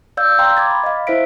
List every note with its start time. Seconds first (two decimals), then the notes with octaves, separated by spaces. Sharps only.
0.17 D5 F5 E6 G6
0.38 F5 G5 A#5 C6
0.57 D6 G#6 A6
0.71 B5
0.83 D#5 F5
1.07 E4 C5 E5 B6 D7